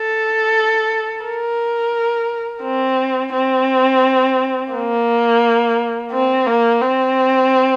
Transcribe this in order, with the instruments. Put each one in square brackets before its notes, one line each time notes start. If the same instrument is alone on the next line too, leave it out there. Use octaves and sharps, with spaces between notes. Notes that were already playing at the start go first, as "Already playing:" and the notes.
Already playing: [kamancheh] A4
A#4
C4
C4
A#3
C4
A#3
C4